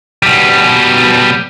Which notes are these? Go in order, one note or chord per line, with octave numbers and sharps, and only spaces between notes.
B2 G3